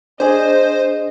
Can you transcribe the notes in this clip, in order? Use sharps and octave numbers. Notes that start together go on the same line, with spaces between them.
D4 G#4 C5 D#5